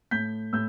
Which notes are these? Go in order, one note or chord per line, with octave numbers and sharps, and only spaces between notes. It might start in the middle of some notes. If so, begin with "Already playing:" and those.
A2 G6 B6
A2 E6 G6